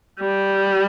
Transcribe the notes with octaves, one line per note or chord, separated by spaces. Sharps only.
G3